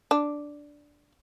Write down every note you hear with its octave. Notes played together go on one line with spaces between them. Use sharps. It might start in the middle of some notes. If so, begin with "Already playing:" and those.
D4